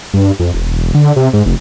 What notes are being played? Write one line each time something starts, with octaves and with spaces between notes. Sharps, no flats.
G2
F2
E1
D3
C3
G#2
F1